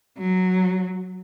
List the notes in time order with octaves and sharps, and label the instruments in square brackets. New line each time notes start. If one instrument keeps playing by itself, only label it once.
[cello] F#3